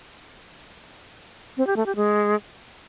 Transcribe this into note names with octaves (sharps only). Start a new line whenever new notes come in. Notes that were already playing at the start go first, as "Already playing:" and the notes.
C4
G4
A3
G4
G#3